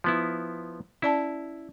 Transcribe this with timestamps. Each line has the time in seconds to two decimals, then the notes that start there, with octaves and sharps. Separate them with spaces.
0.04 F3 B3 E4
1.02 C#4 E4 D5 A5